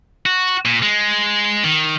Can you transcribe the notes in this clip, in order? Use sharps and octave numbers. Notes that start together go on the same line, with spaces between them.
F#4
A#2
G#3
D#3